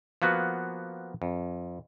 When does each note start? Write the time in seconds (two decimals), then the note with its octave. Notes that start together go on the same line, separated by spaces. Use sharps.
0.22 F3 A#3 B3 F#4
1.22 F2